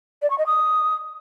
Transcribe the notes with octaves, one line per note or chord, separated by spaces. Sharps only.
D5
C#6
D#5
D#6